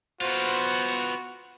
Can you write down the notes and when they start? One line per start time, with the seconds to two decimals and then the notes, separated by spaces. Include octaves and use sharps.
0.21 B3 F4 F#4 C5